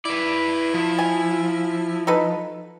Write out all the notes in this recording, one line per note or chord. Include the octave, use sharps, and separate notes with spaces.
E4 B4 D5
F3
G#5
D#4 A4 B4